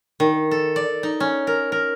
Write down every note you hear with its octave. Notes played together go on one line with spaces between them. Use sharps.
D#3
A4
D5
D#4
C#4
A#4
A#4